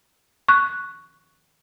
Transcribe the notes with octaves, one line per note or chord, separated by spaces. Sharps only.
C#6 F#6